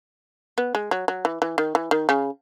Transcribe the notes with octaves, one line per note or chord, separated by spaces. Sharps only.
B3
G#3
F#3
F#3
E3
E3
D#3
E3
D#3
C#3